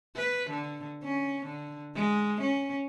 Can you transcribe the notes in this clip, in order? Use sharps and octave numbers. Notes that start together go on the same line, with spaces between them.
B4
D3
C#4
D3
G#3
C#4